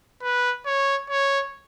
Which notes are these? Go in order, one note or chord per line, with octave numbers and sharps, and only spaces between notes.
B4
C#5
C#5